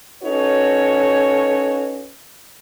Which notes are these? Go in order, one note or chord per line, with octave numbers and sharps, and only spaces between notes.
C#4 D#4 F#4 A4 B4 C#5